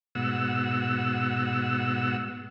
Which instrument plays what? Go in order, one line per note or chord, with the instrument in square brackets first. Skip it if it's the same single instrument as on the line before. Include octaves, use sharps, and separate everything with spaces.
[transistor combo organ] G#2 B2 F#5 E6